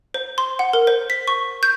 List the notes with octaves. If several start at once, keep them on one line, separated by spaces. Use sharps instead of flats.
C5
C6
F#5
A#4
C5
B6
C#6
G6